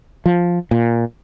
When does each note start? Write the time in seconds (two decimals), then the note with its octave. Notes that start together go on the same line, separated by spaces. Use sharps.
0.26 F3
0.71 A#2